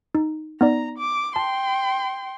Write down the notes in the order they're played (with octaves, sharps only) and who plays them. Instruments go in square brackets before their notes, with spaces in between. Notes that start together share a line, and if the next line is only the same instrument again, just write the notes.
[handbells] D#4
[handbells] B3 D#4 D5 [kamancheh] A#5
[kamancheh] D6
[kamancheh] G5 C6 [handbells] A5